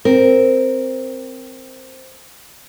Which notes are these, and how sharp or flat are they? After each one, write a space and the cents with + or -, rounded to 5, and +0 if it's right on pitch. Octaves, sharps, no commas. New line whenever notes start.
C4 +0 A#4 +0